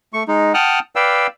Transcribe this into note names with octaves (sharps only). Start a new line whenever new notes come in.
A3 C#6
G#3 D#4
F#5 G5 A5 D#6 F6 F#6
B4 D5 F5 G5 E6